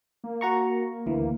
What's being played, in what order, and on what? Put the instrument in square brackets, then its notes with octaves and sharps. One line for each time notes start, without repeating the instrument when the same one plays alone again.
[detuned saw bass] A#3
[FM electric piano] F#4 A#5 C#6
D2 E3